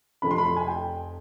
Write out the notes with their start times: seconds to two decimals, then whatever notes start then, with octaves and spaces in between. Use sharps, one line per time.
0.22 F1 F2 C3 F3 A3 B5
0.31 C6
0.38 B5
0.56 G#5
0.67 G5